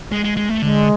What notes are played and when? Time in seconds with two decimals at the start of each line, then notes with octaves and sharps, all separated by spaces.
0.12 G#3
0.24 G#3
0.37 G#3
0.49 A3
0.62 D3 G#3